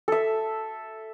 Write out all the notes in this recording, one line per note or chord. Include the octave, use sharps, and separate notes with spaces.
A4 E5